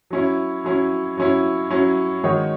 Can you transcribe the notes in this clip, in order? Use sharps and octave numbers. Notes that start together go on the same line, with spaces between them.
F#3 C#4 E4
F#3 C#4 E4
F#3 C#4 E4
F#3 C#4 E4
D#3 G#3 D#4 F#4 C#5